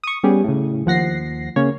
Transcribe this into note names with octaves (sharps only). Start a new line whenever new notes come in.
C#6 D#6
G3 B3 C#4 G4 G#4
A2 C#3
D#2 F3 F#5 A#6 C7
C#3 A#3 C#4 C#5